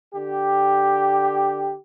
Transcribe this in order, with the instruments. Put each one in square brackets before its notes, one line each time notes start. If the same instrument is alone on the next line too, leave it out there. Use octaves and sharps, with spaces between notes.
[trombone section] D3 G4